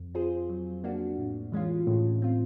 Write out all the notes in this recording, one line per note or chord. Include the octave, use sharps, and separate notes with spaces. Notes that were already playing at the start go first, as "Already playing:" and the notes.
Already playing: F2
C4 F4 G#4 C5
F#3
A#3 D4 F#4
A2
E3 G#3 C#4 F4
A2 G#3
C4 F4